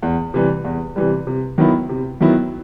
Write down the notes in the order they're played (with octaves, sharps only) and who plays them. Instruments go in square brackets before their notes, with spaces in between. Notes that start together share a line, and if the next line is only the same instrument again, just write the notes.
[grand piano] E2
C3 E3 G3
E2
C3 E3 G3
C3
D#3 F#3 B3 E4
C3
D#3 F#3 B3 E4